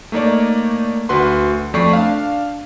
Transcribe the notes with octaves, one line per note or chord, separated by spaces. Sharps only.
A3 A#3 D#4 C#5 D5
D2 F#4 B4 C6
F2 A3 D5 C#6 C7
D4 F5